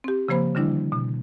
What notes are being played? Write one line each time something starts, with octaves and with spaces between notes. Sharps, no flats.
C4 G4
C#3 F3 A#3 C5 B5
D3 D#3 G3 D4 E4
B2